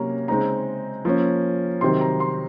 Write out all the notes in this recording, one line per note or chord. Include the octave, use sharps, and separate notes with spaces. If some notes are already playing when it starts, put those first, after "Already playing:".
Already playing: C3 F#3 A#3 C#4 A#5
C#3 G#3 C4 D#4 A#5
F3 A#3 C#4
C3 D#3 F#3 C4 D#4 C6
A#5
C6